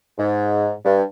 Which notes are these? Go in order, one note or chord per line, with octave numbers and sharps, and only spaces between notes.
G#2
G2